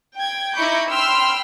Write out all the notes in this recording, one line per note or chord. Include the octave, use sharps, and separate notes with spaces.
G5 G#6
D#4 E4 B5 C#6 D6 G6
G5 B5 C6 E6 F6